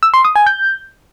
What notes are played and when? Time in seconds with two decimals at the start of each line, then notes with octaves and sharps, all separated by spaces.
0.03 E6
0.14 C6
0.25 D#6
0.36 G#5
0.46 G6